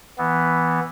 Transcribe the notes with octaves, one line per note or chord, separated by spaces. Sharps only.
E3 B3